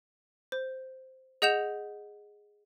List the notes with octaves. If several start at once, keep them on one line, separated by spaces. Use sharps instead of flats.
C5
G#4 D#5 F#5 G6 E7 F7